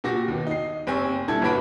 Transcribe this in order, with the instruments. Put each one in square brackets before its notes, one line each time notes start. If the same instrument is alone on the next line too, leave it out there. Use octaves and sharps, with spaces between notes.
[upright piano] A#2 F#4 G4 A#6
D#2 B2
D#4 C7
F#1 C4 G4 G#5 C#6
A#2 G3 D4 E4 A4 G#6
G1 G2 E3 F#4 B5 D7